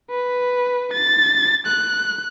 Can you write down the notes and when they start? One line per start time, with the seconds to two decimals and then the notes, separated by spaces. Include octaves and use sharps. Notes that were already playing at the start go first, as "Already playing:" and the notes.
0.10 B4
0.93 A6
1.66 F#6